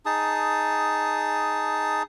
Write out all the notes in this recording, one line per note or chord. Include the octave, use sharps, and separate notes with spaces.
D#4 G#4 A5 D#6